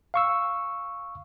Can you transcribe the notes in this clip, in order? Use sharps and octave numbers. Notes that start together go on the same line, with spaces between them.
F5 C#6 E6